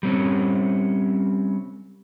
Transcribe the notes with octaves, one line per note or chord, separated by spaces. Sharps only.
G3 C4 C#4